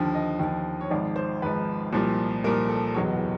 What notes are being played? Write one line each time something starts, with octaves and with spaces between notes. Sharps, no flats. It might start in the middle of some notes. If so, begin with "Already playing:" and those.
Already playing: D#2 D3 F3
D#5
D#2 D3 F3
C#5
G#1 G#2 F3 D5
C5
G#1 G#2 F3 B4
C2 A#2 F3
C2 A#2 F3 A#4
A4
F#1 E2 B2 F#3 C#5